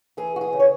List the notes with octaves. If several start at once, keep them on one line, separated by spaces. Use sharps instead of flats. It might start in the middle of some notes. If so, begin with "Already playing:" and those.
E3 G#4
F#4
G#4
C#3
C#5